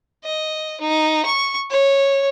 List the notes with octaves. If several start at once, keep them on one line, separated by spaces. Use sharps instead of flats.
D#5
D#4
C#6
C#5